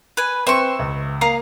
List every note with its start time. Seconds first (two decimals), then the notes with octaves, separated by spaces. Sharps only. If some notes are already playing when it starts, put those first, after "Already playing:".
0.17 B4 G#5
0.47 C4 B4 E5 C6 C#6
0.79 C#2
1.21 A#3 F5 A#5 D#6